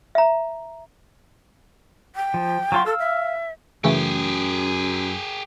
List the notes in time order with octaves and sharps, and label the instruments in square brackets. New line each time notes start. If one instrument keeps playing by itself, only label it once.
[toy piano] E5 A#5
[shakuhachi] G5
[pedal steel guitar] F3
F#3 F4 C6
[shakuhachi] A4 [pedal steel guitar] F5 E6
[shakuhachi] E5
[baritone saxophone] F#2 [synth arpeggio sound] C#3 E3 A3 [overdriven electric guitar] G4 G#4